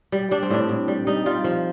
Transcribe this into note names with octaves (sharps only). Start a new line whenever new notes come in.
G3
G3 D4
C4
A2 D4
A2
G3
G3 D#4
G3 F4
F3